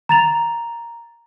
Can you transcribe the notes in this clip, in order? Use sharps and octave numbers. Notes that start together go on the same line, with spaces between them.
A#5 A6 F7